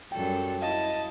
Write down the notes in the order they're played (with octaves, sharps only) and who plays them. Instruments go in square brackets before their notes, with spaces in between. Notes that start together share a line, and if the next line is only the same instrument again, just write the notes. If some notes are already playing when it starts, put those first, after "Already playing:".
[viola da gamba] F#2 G3 A4 [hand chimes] G5
[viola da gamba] E4 [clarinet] D#5 [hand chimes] F5 [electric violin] A5